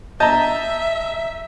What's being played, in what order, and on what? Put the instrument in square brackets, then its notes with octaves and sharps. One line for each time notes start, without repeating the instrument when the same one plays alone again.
[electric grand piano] D#5 G6 [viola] E5 [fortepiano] A5 A#5